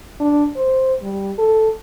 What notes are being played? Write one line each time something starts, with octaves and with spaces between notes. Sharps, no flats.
D4
C5
G3
A4